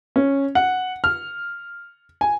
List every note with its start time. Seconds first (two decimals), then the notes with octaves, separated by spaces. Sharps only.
0.16 C#4
0.55 F#5
1.04 F6
2.21 G#5